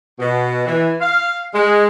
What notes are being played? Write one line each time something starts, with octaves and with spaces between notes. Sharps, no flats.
B2
E3
F5
G#3